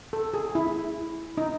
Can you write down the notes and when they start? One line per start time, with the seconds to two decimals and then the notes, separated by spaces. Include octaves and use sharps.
0.13 A4
0.34 G#4
0.55 E4
1.38 D#4